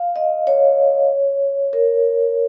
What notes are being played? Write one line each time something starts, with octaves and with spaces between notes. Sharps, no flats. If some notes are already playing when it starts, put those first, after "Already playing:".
Already playing: F5
D#5
C#5
A#4